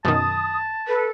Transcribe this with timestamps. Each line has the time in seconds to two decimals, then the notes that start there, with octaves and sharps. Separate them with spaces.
0.05 F#2 B2 D#3 A5 D#6
0.88 A4 B4